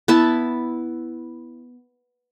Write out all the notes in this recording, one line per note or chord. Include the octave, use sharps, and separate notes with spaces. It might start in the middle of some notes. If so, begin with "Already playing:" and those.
B3 E4 E5 A5